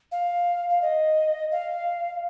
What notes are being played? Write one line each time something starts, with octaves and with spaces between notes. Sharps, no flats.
F5
F5
D#5
F5